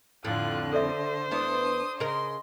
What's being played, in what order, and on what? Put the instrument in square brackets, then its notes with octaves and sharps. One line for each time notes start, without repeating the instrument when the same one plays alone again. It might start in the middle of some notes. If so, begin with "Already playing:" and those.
[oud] F2 A2 [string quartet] D3 [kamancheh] F4 F#6
[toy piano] A4 D5 E5 [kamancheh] C5
[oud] E2 B3 E4 [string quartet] D4 D#6
[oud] C#3 A#4 [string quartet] D#5 C6